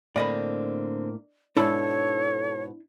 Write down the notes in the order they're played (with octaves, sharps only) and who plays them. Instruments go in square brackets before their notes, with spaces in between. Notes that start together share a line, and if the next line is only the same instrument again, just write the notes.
[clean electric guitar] A2 A#3 [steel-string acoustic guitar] D3 C4 [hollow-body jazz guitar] D5 D#5 B5
[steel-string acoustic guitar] G#2 B2 [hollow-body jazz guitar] D4 E4 [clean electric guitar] A4 [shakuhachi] C#5